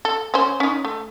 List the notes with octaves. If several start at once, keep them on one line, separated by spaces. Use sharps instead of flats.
A4
C#4 C5
C#4 D#4
A3